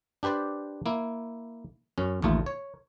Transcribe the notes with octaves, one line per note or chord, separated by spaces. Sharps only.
D4 G4 B4 C5 D5
A#3 E4
F#2 C#4
A1 D#2 A3 F4
C#5